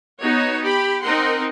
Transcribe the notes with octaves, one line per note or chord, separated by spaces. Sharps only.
B3 D#4 F#4 C#5
G4 B5
C4 D#4 A#4 F#5 C6